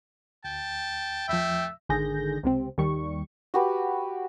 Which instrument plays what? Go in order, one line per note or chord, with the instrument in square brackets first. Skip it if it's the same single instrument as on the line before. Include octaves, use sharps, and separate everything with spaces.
[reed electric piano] D2 [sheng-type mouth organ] G5 [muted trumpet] A5
[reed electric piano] E2 F3 [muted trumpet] A3 [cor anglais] E5
[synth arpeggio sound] G#1 D3 D#3 G#4 G6 A#6
C#2 C3 C4
D#2 D#3 G3 C#6
[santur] F#4 G4 B4